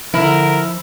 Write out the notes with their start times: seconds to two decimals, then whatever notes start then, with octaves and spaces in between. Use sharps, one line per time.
0.14 D3 F3 E4 A#4